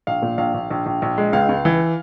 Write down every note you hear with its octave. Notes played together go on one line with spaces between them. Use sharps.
A#1 F5
A#2
A#1 F5
A#1
A#1
A#1
A#1
G#3
C#2 F5
C#2
E3